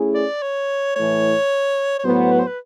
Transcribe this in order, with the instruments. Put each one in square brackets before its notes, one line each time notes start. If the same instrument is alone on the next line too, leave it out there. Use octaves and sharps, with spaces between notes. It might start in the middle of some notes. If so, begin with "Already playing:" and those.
Already playing: [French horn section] A3 C#4 E4 G#4
[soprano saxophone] D5
C#5
[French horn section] A2 E3 A3 [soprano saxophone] C#5
[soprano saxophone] C#5
[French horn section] A2 F#3 B3 [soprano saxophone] C5
[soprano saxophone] B4
C5
B4